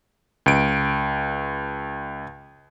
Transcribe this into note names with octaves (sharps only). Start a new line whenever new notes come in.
C#2 D7